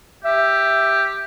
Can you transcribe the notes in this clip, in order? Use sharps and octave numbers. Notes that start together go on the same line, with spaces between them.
G4 E5